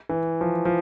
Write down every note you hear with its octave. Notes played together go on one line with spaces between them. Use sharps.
E3
F3
F3